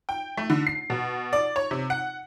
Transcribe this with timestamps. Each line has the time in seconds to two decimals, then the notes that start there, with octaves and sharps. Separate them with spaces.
0.09 G5
0.37 A3
0.50 D3
0.67 C7
0.90 B2
1.33 D5
1.56 C#5
1.71 C3
1.90 F#5